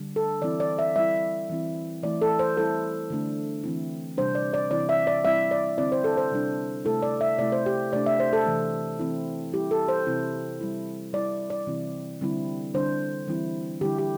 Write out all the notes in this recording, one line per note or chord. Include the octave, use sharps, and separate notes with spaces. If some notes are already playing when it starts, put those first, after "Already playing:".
Already playing: D3 G3 D4
A4
E3 C4 E4 D5
D5
E5
G3 E4 E5
E3 C4 E4
E3 A3 E4 D5
A4
C5
G3 C4 E4 A4
D3 A3 D4
E3 C4 E4
C3 G3 D4 C5
D5
D5
C3 E3 C4 E4 D5
E5
D5
G3 C4 E4 E5
D5
D3 C4 E4 D5
C5
A4
C5
C3 G3 D4
C3 A3 E4 A4
D5
E5
C3 A3 E4 D5
C5
G4
C3 A3 D4 D5
E5
C5
A4
C3 E3 A3
E3 C4 E4
G3 E4 G4
A4
C5
C3 E3 C4 E4
G3 E4
G3 E4 D5
D5
C3 E3 C4 E4
D3 G3 C4 E4
D3 G3 D4 C5
E3 G3 C4 E4
D3 G3 E4 G4
G4